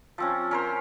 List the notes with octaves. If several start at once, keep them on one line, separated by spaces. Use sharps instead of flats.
F3 C4 C#4
C#4 A#4 C5